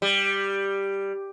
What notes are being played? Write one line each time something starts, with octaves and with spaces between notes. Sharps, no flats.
G3